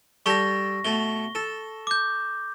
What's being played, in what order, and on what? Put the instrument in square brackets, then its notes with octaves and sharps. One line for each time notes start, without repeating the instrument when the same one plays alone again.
[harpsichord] G3 G4 A4 [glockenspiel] C#6 A#6
[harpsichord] B2 A3 [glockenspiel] G7
[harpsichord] A4
[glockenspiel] D6 G6